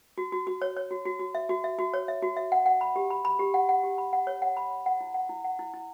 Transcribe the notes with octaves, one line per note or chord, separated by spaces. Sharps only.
F#4
F#4
F#4
C#5
C#5
F#4
F#4
F#4
E5
F#4
E5
F#4
C#5
E5
F#4
E5
F#5
F#5
B5
G4
B5
B5
G4
F#5
F#5
G4
B5
F#5
C#5
F#5
B5
B5
F#5
E4
F#5
E4
F#5
E4
E4